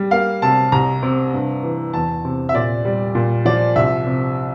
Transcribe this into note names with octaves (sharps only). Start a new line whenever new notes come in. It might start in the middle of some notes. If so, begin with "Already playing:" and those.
Already playing: G3
A#3 F5
C3 A5
C2 A#5
C3
G2
E3
E2 A5
C3
E5
A#2 D5
G3
A#2
F3 D5
C2 E5
C3